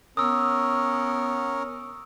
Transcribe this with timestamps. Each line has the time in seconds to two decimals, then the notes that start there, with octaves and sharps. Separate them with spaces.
0.17 B3 C#4 A#4 D#6 E6